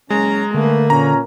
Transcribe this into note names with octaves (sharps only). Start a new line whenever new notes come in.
F#1 G#3 C#4 A#5
D3 A3 A#3 B4
A#2 C#4 A#5